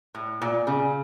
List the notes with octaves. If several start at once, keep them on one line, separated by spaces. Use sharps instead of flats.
A2
A#2
C#3